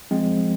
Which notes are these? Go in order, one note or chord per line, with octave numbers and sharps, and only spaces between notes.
F3 G#3 C4